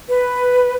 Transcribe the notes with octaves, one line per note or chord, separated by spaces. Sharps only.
B4